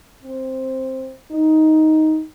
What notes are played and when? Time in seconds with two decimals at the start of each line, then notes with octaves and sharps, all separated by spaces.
0.23 C4
1.31 D#4